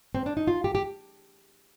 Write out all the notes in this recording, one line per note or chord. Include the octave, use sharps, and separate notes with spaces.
C4
D4
D#4
F4
G4
G4